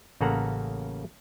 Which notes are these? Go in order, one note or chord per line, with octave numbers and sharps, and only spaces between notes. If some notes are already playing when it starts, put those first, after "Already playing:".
A1 C#3 A#3 A4 F#5 A#5